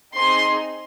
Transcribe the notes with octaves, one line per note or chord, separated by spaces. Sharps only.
C4 D#4 G#4 C6